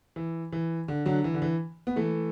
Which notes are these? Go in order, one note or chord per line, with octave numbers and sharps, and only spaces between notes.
E3
E3
D3
D3 F#3
E3
D3
E3
B3
E3 A3